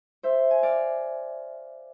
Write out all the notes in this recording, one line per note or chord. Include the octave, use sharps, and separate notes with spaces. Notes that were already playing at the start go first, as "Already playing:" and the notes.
C5 E5
G#5
D5 F5